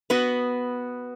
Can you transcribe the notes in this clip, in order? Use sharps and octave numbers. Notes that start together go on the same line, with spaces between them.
B3 F#4 B4